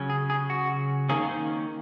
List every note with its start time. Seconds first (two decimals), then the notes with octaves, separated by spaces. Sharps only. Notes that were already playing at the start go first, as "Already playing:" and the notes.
Already playing: C#3 F#3 C#4
0.10 G#4
0.30 G#4
0.50 F#4
1.09 D#3 A#3 C#4 G#4
1.29 C5